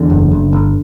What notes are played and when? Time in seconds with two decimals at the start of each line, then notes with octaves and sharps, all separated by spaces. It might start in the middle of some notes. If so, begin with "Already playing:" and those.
Already playing: E2 D3
0.10 F#1
0.31 F#1
0.53 G1